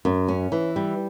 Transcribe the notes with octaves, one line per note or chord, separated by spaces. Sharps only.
F#2
C#4
E3
G3